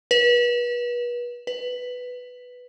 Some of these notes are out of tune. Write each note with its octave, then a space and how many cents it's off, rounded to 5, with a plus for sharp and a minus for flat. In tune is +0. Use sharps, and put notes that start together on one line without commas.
B4 -35
B4 +5